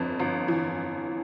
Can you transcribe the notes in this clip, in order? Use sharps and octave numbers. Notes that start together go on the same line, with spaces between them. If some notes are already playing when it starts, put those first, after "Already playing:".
Already playing: G1 F2
G1
E3